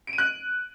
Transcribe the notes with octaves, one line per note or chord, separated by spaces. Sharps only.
D7
D#7
F#6